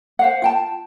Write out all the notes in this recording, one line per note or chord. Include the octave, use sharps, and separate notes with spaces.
C5 F5 F#5
F4 G5 A5